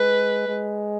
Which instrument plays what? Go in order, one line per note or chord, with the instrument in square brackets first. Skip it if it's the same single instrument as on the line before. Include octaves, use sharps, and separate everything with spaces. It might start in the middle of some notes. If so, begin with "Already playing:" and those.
Already playing: [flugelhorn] G#3 [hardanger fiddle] B4
[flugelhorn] G#3